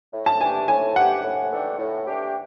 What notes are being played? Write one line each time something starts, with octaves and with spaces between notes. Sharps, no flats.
A2
A5
E3 A3 D4 G4 G#5
A2 G#5
E3 A3 D4 G4 F#5
A2
E3 A3 D4 G4
A2
E3 A3 D4 G4